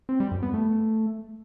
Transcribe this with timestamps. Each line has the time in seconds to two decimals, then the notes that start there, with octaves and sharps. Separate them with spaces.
0.09 C4
0.20 G3
0.31 F#2
0.43 B3
0.54 A3